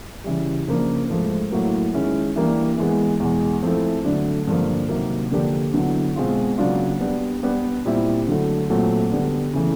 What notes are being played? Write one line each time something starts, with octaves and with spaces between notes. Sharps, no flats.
C#3 E3 G3
C#3 F3 A#3 D4
G#2 F3 A3
A2 F#3 A#3
D#3 G#3 C#4 E4
E3 G3 A#3 D4 G4
E3 G#3 B3
E2 B2 G#3
F3 A3 C4 E4 A4
D3 F#3 A3 D4
G2 D3 F3 A#3
C3 D#3 F#3 A#3
D3 F3 A#3 D4 G4
D3 F#3 B3 E4
B2 G#3 C4 F4
C#3 F#3 A#3 D4 F4
G3 B3 D4
G3 B3 D4 G4 B4
A#2 G3 C4 E4
D3 F#3 A3
A#2 F#3 A3 C4
D3 G3 B3 D4
C#3 E3 A3